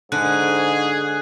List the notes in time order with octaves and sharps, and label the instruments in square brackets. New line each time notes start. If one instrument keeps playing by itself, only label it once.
[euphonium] G#2 [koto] D3 [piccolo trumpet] G#4 [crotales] F#6